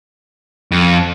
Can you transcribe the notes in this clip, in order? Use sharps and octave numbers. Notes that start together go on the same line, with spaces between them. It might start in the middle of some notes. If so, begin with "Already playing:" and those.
F2